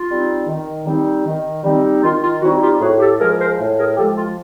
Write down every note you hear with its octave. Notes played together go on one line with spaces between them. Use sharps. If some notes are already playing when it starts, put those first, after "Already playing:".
Already playing: F4
G3 C4 D#4
D#3
G3 C4 D#4
D#3
G3 C4 D#4
D#3 F4
F4
G3 C4 D#4 E4 F#4
F4 G4
A2 F#4 G#4
G4 A4
F3 G#3 G#4 A#4
A#4 C5
A2
G#4 A#4
F3 G#3 G4 A4
F4